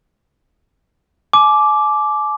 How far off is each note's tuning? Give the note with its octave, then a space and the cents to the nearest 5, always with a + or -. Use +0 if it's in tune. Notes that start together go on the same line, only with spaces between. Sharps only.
G#5 +45 D6 +0